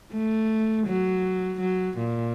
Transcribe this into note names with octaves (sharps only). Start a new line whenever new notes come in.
A3
F#3
F#3
A#2